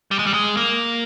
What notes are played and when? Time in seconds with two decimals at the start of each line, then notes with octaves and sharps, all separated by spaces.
0.11 G3
0.19 G#3
0.26 G3
0.34 G#3
0.57 A#3